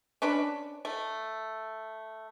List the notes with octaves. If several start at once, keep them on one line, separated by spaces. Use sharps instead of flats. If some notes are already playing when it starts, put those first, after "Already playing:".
C#4 D4 B4 B5
A3